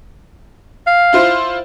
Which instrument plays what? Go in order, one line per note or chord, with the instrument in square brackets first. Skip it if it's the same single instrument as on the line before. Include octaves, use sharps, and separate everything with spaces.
[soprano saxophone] F5
[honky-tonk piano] E4 F4 C5